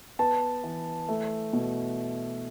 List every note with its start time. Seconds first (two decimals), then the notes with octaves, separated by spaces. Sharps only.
0.19 B3 A5
0.64 E3
1.09 A3
1.53 B2